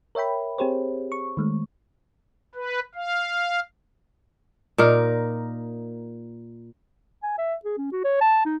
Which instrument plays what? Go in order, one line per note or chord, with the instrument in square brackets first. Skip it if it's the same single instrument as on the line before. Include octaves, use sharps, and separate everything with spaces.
[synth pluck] A#4 C#5 E5 G5 B5
C4 G4 G#4 C5 C#5
C#6
D#3 G#3 A3
[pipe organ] B4
F5
[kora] A#2 D#4 A#4
[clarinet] G#5
E5
G#4
C#4
F#4
C#5
A5
D#4